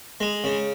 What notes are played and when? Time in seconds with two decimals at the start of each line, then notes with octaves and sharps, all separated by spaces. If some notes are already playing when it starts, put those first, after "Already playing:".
0.20 G#3
0.44 C#3